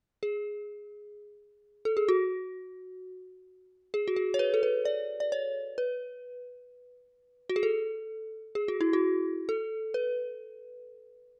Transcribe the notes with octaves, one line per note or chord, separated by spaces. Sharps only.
G#4
A4
G#4
F#4
G#4
F#4
G#4
C#5
B4
A4
B4
D5
D5
C#5
B4
F#4
G#4
A4
G#4
F#4
E4
F#4
A4
B4